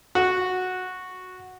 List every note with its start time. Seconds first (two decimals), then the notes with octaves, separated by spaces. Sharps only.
0.15 F#4